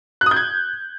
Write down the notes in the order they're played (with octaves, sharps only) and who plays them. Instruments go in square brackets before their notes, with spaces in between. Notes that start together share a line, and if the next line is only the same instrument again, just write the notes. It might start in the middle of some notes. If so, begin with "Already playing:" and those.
[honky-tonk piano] F#6
D#6
G6
G#6